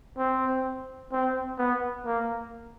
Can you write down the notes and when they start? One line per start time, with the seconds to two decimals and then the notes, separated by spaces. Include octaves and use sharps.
0.18 C4
1.12 C4
1.58 B3
2.06 A#3